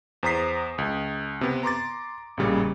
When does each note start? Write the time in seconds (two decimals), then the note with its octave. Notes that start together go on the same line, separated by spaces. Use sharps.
0.23 E2 C5 A#5 D#6 B6 C7
0.78 C#2
1.41 C3 B3
1.63 A#5 C6 D6 A6
2.37 A1 A#2 C#3 G3